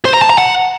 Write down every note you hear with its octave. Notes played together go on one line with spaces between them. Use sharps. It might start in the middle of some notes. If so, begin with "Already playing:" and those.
C5
A#5
A5
A#5
F#5